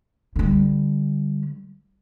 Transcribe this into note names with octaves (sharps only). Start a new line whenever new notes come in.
D3 G3